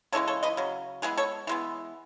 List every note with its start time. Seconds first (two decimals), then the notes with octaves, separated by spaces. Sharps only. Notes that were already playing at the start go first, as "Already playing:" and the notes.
0.12 C#3 E3 G#3 C#4 A4 C#5
0.28 A4 C#5
0.43 B4 D#5
0.57 C#3 F#3
1.02 E3 G#3 B3 G#4 B4
1.17 A4 C#5
1.47 E3 G#3 B3